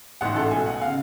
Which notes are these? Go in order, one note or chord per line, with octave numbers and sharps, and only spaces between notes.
A1 G#2 F#5
A4
B1 B2 G#5
F#5
F5
C#3